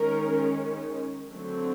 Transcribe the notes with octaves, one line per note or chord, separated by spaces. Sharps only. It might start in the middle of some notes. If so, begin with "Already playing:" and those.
Already playing: D#3 G#3 C#4 A#4
D3 F#3 A3 C4